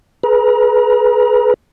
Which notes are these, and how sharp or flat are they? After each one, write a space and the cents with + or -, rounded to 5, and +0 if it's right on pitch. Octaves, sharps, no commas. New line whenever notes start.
G#4 +35 B4 +0 A#5 +35